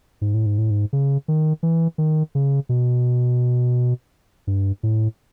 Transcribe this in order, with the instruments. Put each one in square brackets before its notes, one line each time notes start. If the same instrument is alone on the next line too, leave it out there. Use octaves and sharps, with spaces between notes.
[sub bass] G#2
A2
G#2
A2
G#2
C#3
D#3
E3
D#3
C#3
B2
G2
A2